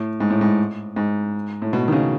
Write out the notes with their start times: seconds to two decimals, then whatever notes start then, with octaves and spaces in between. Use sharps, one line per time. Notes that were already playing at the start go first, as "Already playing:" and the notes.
Already playing: A2
0.20 G#2
0.30 A2
0.41 G#2
0.96 G#2
1.62 A2
1.73 B2
1.88 D#3
1.92 C#3